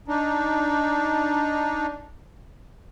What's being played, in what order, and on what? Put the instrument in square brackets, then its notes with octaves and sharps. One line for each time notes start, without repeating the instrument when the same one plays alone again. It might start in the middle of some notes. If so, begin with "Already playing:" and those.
[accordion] D4 D#4